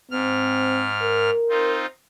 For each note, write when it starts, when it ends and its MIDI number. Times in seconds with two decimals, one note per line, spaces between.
0.11 1.30 44
0.11 0.88 60
0.11 1.30 89
1.02 1.81 70
1.49 1.86 60
1.49 1.86 63
1.49 1.86 65